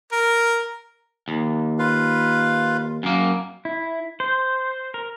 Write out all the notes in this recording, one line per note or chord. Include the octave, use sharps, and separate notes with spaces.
A#4
D#2
F4 B4 F5
F#2 A#3
E4
C5
A#4